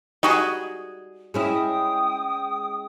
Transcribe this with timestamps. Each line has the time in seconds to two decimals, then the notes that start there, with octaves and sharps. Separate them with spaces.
0.23 G3 D#4 F#4 G#4 D#5
1.34 G#3 C#4 E4 G5 D#6